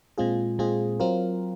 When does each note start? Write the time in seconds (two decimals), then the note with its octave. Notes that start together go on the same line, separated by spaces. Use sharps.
0.18 A#2 G#3 C4 F4 G#4
0.59 A#2 G#3 C4 F4 G#4
1.00 F#3 C4 F4 A#4